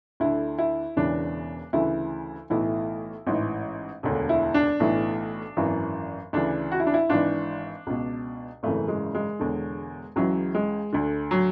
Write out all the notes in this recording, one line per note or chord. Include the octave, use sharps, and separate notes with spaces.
D2 D3 E4
E4
E1 E2 C#3 E3 D4
D2 C#3 E3 E4
B1 A2 E3 E4
A1 G#2 E3
E1 D2 D3
E4
D4
B1 A2 E3
G#1 F#2 E3
D2 C#3 E3 D4
F#4
E4
D4
E4
G#1 G#2 E3 D4
C#2 B2
G#1 F#2 C#3 E3 A3
G#3
G#3
E1 E2 D3
C#2 C#3 E3 F#3
G#3
D2 D3
F#3